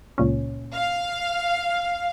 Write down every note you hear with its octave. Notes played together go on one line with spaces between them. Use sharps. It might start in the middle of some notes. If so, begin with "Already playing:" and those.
C#2 A#2 C#4
F5